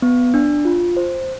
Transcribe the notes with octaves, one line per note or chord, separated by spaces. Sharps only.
B3
D4
F4
C5